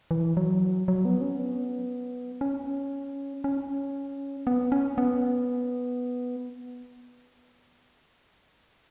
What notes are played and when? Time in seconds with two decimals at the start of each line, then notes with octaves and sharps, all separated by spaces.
0.11 E3
0.37 F#3
0.88 F#3
1.05 B3
1.21 C#4
1.39 B3
2.41 C#4
3.44 C#4
4.47 B3
4.72 C#4
4.98 B3